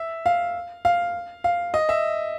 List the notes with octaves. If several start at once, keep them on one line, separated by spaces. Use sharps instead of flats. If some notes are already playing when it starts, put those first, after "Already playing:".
Already playing: E5
F5
F5
F5
D#5
E5